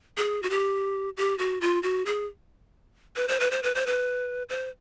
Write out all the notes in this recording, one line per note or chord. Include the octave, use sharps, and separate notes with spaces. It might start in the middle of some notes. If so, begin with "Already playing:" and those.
G#4
F#4
G4
G4
F#4
F4
F#4
G#4
B4
C5
B4
C5
B4
C5
B4
C5